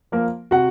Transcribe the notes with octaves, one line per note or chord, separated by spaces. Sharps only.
F3 A#3 A#4
C3 F#4 F#5